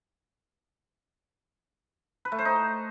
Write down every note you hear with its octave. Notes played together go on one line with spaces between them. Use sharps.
B4
A3
C5
D#4